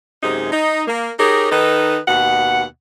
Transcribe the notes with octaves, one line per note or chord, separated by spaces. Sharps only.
F#2 C3 G#3 D#4
D#4
A#3
D#4 G4 G#4 A#4 C#5
D#3 D#4 A4 B4
D#2 B2 F#5